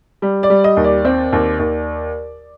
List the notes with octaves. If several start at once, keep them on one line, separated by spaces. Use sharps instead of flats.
G3
D5
G3
D#5
D#2
D5
C4
D#2
D#2